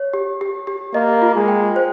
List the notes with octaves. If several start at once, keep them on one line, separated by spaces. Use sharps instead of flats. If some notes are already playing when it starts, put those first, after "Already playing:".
Already playing: C#5
G4
G4
G4
A#3 D#5
F4
G#3
G5
C5